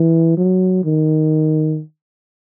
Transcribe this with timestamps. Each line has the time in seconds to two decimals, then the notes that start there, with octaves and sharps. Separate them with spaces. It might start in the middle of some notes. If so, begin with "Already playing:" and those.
Already playing: E3
0.37 F#3
0.84 D#3